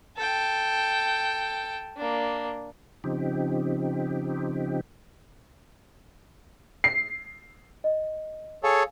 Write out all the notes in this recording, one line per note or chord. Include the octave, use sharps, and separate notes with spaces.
A4 G5
A#3 D4
C#3 F3 C4 D#4 G4
C7
D#5
G#4 A4 C#5 F5 G#5